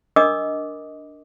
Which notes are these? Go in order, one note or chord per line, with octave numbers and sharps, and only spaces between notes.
D4 A#4 D#5 D6 D#6